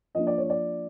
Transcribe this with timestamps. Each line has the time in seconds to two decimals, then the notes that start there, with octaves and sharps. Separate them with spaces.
0.15 F3 A#3 D4 D#5
0.27 D5
0.38 C#5
0.50 D5